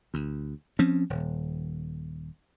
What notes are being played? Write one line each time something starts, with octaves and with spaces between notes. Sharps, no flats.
D2
F3 C4 C#4
D#1